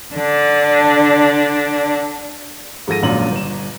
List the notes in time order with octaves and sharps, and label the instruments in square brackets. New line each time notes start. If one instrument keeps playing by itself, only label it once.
[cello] D3 D4
[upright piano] G#2 F3 A4 A#6 D#7
E1 A#1 F#2 A#2 D4 F#7
G1 E7